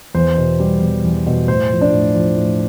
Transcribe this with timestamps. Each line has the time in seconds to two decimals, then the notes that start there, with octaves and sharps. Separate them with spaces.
0.14 E2 C5
0.37 B2
0.60 G3
0.81 E2
1.04 E2
1.26 B2
1.48 A2 C5
1.70 F3
1.81 D4 D5
1.93 A2
2.15 F3 C5
2.37 A2